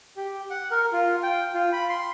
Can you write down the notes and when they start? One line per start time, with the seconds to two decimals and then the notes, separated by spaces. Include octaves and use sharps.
0.17 G4
0.51 F#5
0.71 A#4
0.93 F4
1.23 G5
1.54 F4
1.73 B5
1.90 C6